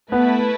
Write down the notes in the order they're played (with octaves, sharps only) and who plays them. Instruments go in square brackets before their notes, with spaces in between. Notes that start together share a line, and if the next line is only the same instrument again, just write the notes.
[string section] A3 E4 B4 [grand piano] B3